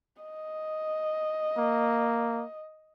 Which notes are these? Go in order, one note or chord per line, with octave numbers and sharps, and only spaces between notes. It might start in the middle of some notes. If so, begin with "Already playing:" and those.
D#5
A#3